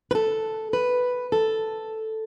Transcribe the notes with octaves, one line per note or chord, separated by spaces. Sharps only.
B4
A4
B4
A4